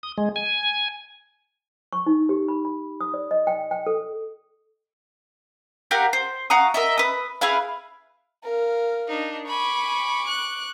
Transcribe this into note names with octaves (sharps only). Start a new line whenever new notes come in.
D#6
G#3
G#5
C#6
D#4
G4
B5
B5
D#6
D5
D#5
G5
G5
A4
G4 A#4 F5 F#5
C5
F#4 F5 A#5 D#6
A#4 D#5 E5
B4 D#6
E4 G#4 B4 F5
A#4 F5
D4 D#4
G#5 B5 C#6 D6
F#6